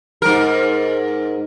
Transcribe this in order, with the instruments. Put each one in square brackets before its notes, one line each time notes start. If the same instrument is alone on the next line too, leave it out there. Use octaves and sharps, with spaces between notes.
[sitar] G#2 A#4